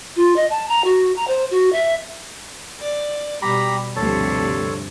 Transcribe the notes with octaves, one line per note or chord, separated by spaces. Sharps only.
F4
D#5
A5
A#5
F#4
A#5
C5
F#4
E5
D5
B2 G3 G4 A#5 B5
D2 G2 C3 F3 A4 C#5 A5